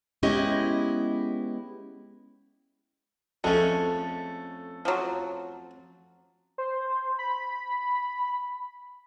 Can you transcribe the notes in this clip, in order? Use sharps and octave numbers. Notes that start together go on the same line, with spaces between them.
G#3 B3 C#4 E4 G4 D#5
F2 G#3 A3 C#4 A4
F3 F#3
C5
B5